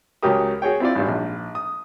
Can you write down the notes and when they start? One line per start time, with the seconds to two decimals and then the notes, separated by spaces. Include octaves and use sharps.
0.23 C#2 F#3 G4 A#4 D#6
0.62 F#4 G#4 C#5 G5
0.80 C4 E4 F4 D5
0.95 G#1 G2
1.08 A#1
1.55 D#6